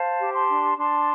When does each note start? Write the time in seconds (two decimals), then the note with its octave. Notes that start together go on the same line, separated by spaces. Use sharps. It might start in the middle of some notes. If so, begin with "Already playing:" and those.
Already playing: C5 F5 A5
0.20 G4
0.34 A5 C6
0.49 D4
0.78 D4 A5 C6